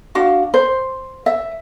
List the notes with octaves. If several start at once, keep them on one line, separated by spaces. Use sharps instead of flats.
D4 F#4 F5
C5
E5